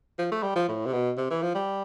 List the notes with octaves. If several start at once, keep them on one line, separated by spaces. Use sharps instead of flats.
F3
A3
G3
F3
A2
C3
B2
C3
E3
F3
G3